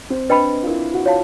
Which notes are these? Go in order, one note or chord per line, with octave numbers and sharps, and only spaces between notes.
C4
D4 B4 D#5 G5 B5
F4
E4 A#4
F#4
F4 C#5 F5 A5